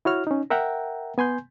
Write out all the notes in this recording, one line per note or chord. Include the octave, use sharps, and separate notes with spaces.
E4 F#4 C#5 F6
C#4 D#4
A#4 E5 F#5 G5 A#5
B3 G#5 C6 G6